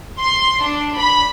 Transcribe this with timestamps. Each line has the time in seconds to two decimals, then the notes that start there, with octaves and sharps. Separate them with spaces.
0.18 C6
0.61 D4
0.97 B5